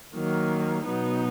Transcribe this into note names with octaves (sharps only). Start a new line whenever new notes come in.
D#3 F#3 A#3
B2 F#3 B3 D#4